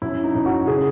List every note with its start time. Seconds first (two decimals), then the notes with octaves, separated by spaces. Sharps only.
0.02 F#2 E4
0.24 D#4
0.35 F#2
0.46 F#4
0.67 C#3 G#4